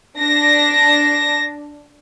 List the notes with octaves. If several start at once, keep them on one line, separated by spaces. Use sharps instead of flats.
D4 A#6